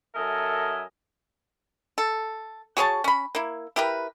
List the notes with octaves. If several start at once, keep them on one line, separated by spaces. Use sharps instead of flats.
F#2 A4 A#4 D#5 E5 G#5
A4
F#4 G#4 C#5 A5
C#4 B5
A#3 E4
E4 G4 A#4 B4